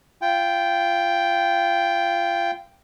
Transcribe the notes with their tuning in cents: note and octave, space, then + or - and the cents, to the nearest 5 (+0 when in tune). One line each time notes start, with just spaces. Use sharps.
F4 -25 G5 +0